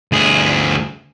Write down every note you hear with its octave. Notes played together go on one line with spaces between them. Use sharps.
D2 G#4